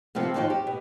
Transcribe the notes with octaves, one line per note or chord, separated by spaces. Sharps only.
C3 F3 A#3 B3
D#2 F3 D#4 F#4 G5
G4
B2